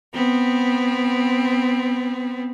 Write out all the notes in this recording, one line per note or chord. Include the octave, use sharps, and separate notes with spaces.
B3 C4